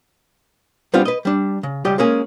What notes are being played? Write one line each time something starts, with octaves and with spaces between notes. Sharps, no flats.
G3 B3 C4 D4 F4
B4 D#5
G3 D4
C#3
C#2 G3 G4 D5 D#5
G#3 A#3 C#4 G#4